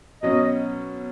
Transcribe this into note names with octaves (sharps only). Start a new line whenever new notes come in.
B2 F#3 C#4 D#5